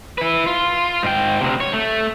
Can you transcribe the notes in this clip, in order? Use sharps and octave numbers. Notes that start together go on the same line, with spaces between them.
E4 B4
F4
G#2 G5
D2 C3
C#5
A3